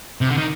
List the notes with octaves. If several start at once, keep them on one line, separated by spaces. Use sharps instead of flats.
C3
D3
D#3